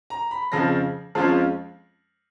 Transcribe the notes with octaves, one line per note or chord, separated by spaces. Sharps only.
A#5
B5
F2 C#3 F3 A#6
F2 F3 G#3 C#4 F4